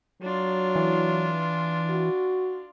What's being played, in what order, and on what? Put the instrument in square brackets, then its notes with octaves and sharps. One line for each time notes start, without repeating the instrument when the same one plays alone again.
[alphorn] F#3 [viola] D4 F4
[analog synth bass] E3
[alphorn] F#4